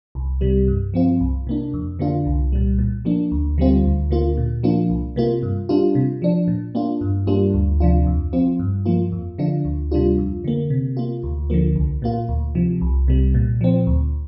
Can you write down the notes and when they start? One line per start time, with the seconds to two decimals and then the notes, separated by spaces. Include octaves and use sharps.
0.15 C2
0.41 C3 G3
0.68 G2
0.94 F3 C4 F4
1.20 C2
1.47 C3 A#3 D4
1.73 F2
1.99 D3 A#3 D4 F4
2.26 C2
2.52 A#2 G3
2.79 A#2
3.05 F3 A#3 D4
3.32 D2
3.58 D3 G3 C4 F4
3.84 D2
4.10 D3 A#3 F4
4.37 A#2
4.63 F3 A#3 D4 F4
4.90 C2
5.16 C3 A#3 F4
5.43 G2
5.69 G3 D4 F4
5.95 C3
6.22 F3 D4
6.48 A#2
6.75 A#3 D4 F4
7.01 G2
7.27 G3 A#3 D4 F4
7.54 D2
7.80 C3 F3 D4 F4
8.06 F2
8.33 F3 C4 F4
8.59 G2
8.85 F3 A#3 F4
9.12 F2
9.38 D3 F3 D4 F4
9.65 D2
9.91 C3 G3 D4 F4
10.18 F2
10.44 D3 A#3
10.70 C3
10.97 A#3 F4
11.23 D2
11.50 D3 F3 A#3
11.75 C2
12.02 A#2 A#3 F4
12.28 D2
12.55 C3 F3
12.81 C2
13.08 C3 G3
13.34 A#2
13.61 F3 C4
13.87 D2